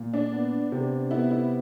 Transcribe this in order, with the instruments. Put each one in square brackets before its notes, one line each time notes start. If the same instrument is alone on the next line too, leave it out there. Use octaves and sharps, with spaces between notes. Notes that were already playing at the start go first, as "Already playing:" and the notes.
Already playing: [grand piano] A#2
[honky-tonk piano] D4
[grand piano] B3
C3
[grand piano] B3 [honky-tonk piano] E4
[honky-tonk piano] E4